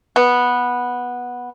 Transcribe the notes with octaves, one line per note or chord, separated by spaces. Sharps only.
B3